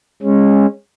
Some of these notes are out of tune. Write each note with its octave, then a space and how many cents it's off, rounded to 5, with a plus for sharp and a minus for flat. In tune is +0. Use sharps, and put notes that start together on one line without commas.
G#3 -20 C#4 -20